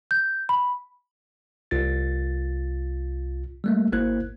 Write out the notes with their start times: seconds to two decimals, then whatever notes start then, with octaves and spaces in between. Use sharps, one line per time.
0.11 G6
0.49 B5
1.71 C2 F4 A6
3.64 G3 A3 A#3
3.93 G#1 A#3 E4 C5 F#6 G#6